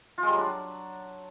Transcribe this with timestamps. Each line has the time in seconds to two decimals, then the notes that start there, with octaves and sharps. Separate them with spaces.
0.18 F4
0.23 G#3
0.28 G3
0.33 F#3
0.38 D4